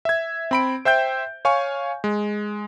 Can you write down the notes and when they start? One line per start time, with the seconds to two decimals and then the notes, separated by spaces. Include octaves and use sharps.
0.05 E5 G#6
0.51 C4 B5 D7
0.85 C5 E5 G5 G6
1.45 C#5 F5 G#5 C#6
2.04 G#3